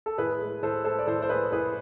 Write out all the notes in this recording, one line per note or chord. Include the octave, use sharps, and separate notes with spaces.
A4
A2 G#4 B4
G#3
A2 A4 C5
G#3 A4 C5
D5
A2 A4 C5
C5
G#3 G#4 B4
A2 G#4 B4